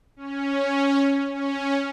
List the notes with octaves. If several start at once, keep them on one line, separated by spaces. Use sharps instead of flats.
C#4
C#4